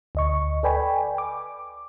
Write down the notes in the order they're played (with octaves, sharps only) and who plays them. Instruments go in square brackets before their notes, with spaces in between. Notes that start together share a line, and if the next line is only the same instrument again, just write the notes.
[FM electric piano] D2 D#5 C#6
A4 B4 D5 G5 G#5 B5
D6